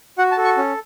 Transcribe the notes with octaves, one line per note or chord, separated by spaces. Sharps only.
F#4 F#5
A5
A4
C#6
C#4